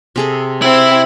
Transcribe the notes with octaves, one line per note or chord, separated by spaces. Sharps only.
C3 G#4 A4
C4 E4 E5 E6